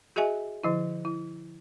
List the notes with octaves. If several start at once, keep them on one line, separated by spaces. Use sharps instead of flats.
F#4 G#4 D#5 E5 G#5
D3 F3 E4
E4